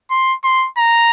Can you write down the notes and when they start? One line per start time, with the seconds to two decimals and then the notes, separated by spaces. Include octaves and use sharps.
0.10 C6
0.44 C6
0.78 A#5